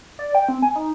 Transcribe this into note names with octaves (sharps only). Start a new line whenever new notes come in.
D5
G5
C4
G#5
D#4